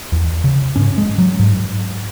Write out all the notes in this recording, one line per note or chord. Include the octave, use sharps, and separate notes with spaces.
E2
C#3
G#2 C#4
G#3
F#3
G#2